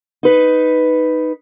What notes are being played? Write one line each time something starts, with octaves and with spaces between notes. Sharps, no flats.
D#4 B4